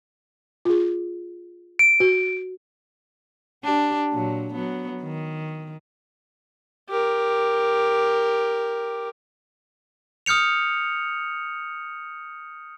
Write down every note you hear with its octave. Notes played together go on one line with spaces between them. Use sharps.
F4 G#4
D7
F#4
D4 G4
A#2 F#3
F#3 B3
D#3
G4 A#4
D#6 F6 G6 C#7 F7